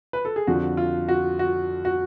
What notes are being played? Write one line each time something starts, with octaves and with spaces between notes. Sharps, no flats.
B4
A4
G#4
F2 D3 F3 F#4
F4
F#4
F#4
F#4